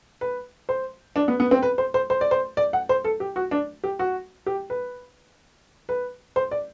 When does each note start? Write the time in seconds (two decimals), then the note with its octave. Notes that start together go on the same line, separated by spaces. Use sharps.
0.21 B4
0.69 C5
1.16 D4
1.28 B3
1.40 B3
1.51 C4
1.63 B4
1.78 C5
1.94 C5
2.10 C5
2.21 D5
2.31 C5
2.57 D5
2.73 F#5
2.89 C5
3.04 A4
3.20 G4
3.36 F#4
3.51 D4
3.84 G4
3.99 F#4
4.46 G4
4.70 B4
5.89 B4
6.36 C5
6.51 D5